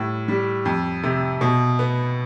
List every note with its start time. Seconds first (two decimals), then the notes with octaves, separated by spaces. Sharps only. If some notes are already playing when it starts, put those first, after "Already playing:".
Already playing: A2 G3
0.28 G3
0.65 F2
1.03 C3
1.41 B2
1.79 B3